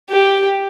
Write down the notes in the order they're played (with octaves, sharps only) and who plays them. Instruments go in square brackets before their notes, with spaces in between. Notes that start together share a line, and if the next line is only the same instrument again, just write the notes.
[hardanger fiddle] G4